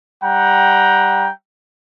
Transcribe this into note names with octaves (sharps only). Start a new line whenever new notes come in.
G3 F#5 G5 A#5